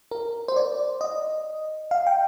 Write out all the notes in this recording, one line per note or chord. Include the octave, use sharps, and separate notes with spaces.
A#4
C5
D5
D#5
F5
G5